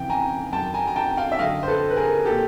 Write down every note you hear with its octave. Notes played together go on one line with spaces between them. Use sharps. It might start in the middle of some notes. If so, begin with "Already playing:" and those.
Already playing: F2 C#3 E3 G5
G#5 A#5
F#2 D#3 G5 A5
G#5 A#5
A#5
G5 A5
F5 G5
E5
F#2 D3 D#5 F5
C5
A4 B4
B4
G#4 A#4
A#2 G4 A4